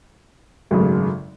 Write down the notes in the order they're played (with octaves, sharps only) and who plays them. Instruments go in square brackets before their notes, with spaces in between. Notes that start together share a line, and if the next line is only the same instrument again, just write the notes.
[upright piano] G#1 F#2 C#3 F#3 A3